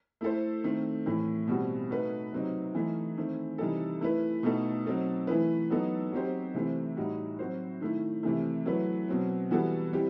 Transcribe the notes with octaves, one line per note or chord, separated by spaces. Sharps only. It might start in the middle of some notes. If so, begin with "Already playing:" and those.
A3 E4 A4 C5
D#3 A3 C4
A2 E3 A3
B2 G3 C4 F#4
A3 D#4 F#4 B4
C3 F#3 C4 D#4
E3 A3 D#4
D#3 A3 C4
C3 E3 G3 D#4 A4
A3 E4 B4
B2 A3 D#4 A4
F#3 C4 D#4 A4
E3 A3 E4 B4
F#3 B3 D#4 A4
F#3 C4 D#4 G4 C5
C3 E3 A3 C4
A2 G3 D#4 F#4
F#3 C4 F#4 C5
D#3 A3 E4
C3 E3 A3
F#3 A3 E4 B4
B2 F#3 C4
E3 G3 B3 F#4 A4
G3 C4 E4 G4